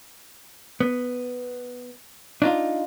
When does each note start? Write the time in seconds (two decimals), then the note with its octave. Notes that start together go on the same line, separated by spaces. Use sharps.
0.80 B3
2.42 D4 D#4 F4